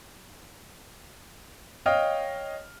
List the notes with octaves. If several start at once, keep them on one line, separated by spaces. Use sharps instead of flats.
C#5 D#5 F5 G5 D#6 F6